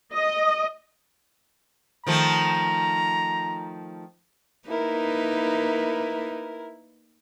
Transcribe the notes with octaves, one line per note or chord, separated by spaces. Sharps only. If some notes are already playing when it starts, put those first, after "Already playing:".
D#5
D#3 F3 A3 A#5
A#3 D#4 E4 A#4 B4